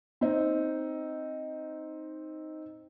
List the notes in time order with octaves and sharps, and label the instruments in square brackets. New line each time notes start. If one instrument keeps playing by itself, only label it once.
[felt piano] C4 D#4